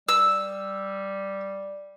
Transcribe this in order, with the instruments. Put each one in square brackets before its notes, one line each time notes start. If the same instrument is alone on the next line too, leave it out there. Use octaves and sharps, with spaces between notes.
[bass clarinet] G3 [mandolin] E6